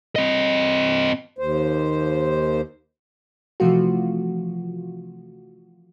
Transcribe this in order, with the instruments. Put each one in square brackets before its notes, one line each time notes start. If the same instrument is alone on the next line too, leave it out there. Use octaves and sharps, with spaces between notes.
[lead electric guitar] C4 D#5
[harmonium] D#2 C5
[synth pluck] C3 E3 F3 A3 F4 F#4